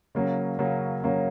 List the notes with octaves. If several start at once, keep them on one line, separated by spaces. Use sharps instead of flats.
C#3 F#3 A#3 C#4
C#3 F#3 A#3 C#4
C#3 F#3 A#3 C#4